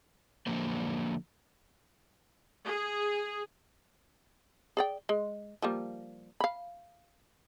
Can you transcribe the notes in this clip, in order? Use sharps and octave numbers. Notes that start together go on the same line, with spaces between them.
D3 F3 F#3 A#3 C5
G#4
G#4 D5 G5
G#3
F3 G3 A#3
F5 B5